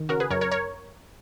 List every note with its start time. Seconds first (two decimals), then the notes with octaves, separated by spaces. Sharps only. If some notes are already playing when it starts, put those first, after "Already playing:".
Already playing: D#3
0.09 C#3 F#4 A#4
0.20 G#4 B4
0.30 F#2 A#4 C#5
0.41 A#4 C#5
0.51 A#4 C#5